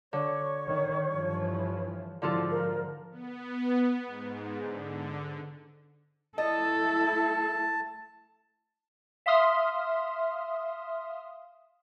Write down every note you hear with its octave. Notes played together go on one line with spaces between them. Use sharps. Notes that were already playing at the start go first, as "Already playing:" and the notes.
D3 C#5
D#3
G2 E3 F3
G#2 D3 F3 E4 F4 A4
A#4
B3
G#2
D3
A3 E4 A4 D#5 A5
E5 F5 C6 D#6 F6